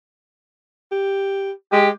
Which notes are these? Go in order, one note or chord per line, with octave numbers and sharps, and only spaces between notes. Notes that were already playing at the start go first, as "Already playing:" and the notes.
G4
G#3 G4